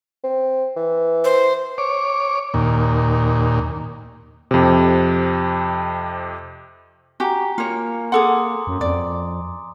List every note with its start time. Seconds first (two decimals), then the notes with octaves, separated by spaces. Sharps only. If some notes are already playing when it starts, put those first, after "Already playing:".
0.24 C4
0.76 E3
1.24 C5
1.78 C#5 D6
2.54 D#2 A#2
4.51 F2 C3
7.20 F#4 G4 G#5 A#5
7.58 A#3 F4 C#5
8.12 G#4 A4 F#5 C6 D6 D#6
8.67 F#2
8.81 F2 D5